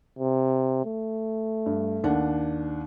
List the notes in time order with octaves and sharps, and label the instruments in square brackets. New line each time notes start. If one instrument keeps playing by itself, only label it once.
[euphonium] C3
A3
[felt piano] G2
D#2 D4 F#5